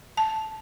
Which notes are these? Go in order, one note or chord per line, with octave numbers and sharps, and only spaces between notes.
A5